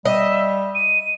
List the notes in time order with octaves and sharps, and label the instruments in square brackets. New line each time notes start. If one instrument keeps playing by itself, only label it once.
[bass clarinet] G3 [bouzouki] D#5 [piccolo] E5
[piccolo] D#7